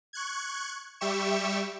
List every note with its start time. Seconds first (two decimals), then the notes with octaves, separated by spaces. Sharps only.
0.13 C#6 F#6 G#6
1.00 G3 G4 E5 C#6 E7